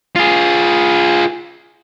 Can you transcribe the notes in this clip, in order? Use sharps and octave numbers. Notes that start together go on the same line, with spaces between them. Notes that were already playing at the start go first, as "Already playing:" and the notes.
F4 G#4